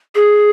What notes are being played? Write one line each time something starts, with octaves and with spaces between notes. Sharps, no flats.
G#4